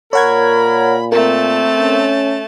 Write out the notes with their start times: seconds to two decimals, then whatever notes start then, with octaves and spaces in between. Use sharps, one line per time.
0.13 A#2 A#4 C#5 F#5 B5 G#6
1.12 A3 C4 A#4 A5
1.77 C#4